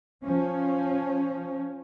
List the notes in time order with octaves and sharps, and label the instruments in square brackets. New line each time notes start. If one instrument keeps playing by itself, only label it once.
[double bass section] F3 C#4